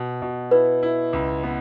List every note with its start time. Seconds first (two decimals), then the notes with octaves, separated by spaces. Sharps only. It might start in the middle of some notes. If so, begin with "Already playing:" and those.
Already playing: B2
0.22 B2
0.51 E4 B4
0.83 E4
1.13 C#2
1.43 B3